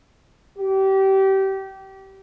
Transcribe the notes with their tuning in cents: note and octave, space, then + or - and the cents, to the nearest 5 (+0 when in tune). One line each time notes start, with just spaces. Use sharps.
G4 -25